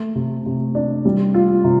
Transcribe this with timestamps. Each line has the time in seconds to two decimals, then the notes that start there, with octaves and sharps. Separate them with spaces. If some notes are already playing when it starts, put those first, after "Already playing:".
Already playing: A3
0.15 C3
0.46 C3
0.75 D4
1.05 G3
1.34 F4
1.64 C3